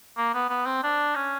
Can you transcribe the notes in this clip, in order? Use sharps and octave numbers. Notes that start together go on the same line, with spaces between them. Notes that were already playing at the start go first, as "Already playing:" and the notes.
A#3
B3
B3
C4
D4
C#4